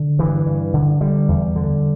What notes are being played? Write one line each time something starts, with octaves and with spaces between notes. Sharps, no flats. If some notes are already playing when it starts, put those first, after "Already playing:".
Already playing: D3
G2 E3
G2
D3
D3 G3
E2
D3